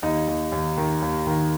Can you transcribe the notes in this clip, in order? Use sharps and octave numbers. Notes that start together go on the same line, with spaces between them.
D#2 D#4
D#2
D#2
D#3
D#2
D#3